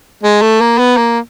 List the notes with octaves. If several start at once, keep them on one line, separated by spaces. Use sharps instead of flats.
G#3
A3
A#3
B3
A#3